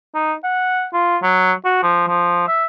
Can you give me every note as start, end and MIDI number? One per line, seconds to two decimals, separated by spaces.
0.15 0.33 63
0.43 0.86 78
0.93 1.17 65
1.23 1.53 54
1.65 1.81 66
1.83 2.03 53
2.08 2.47 53
2.48 2.66 76